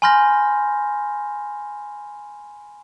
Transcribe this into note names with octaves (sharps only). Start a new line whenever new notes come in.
G#5 B5 C6 F6 G6 A#6